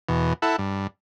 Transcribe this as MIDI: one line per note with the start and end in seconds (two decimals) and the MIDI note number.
0.09 0.33 40
0.09 0.33 47
0.42 0.56 64
0.42 0.56 69
0.42 0.56 78
0.58 0.87 43